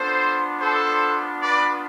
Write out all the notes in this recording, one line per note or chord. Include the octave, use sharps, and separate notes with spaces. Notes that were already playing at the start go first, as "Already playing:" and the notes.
Already playing: B3 D4 F4 A4 C5
A4 C5
B4 D5